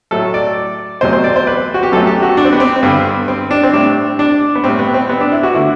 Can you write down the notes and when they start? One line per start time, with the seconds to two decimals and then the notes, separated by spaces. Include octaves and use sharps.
0.11 A2 F#3 A3 A4
0.34 D5
1.01 E2 C3 F#3 A3 C5
1.13 C5
1.24 D5
1.36 C5
1.47 B4
1.74 F#4
1.83 G4
1.92 F#2 F#3 A3 A4
2.07 G4
2.22 F#4
2.37 D4
2.45 C4
2.53 B3
2.60 C4
2.76 C4
2.83 G2 D3 G3 B3
3.28 C4
3.51 D4
3.63 C4
3.73 A2 G3 D4
4.19 D4
4.55 B3
4.64 A2 G3 C4
4.79 B3
4.94 C4
5.09 B3
5.21 D4
5.32 E4
5.43 F#4
5.54 D3 A3 E4